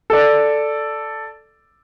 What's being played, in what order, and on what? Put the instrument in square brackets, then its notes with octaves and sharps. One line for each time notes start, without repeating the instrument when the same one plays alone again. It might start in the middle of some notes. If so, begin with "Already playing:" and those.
[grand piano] A4 D5